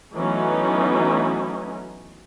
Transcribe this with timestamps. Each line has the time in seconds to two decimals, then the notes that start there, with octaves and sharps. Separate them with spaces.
0.15 E3 F#3 A3 B3 C#4 D#4